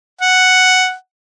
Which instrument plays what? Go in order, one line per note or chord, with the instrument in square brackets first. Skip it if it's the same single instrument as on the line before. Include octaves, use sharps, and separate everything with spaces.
[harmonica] F#5